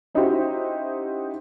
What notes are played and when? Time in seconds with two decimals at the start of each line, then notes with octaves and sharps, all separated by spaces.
0.15 C#4 D#4 E4 F#4 G4 C5